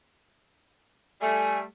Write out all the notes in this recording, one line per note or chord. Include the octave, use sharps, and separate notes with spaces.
G3 A3 G#5